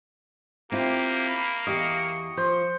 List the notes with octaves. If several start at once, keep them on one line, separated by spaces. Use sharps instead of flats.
A#3 C4 E4 F4 G4
B5
E2 G4 D#5 F5 C#6
F3 C5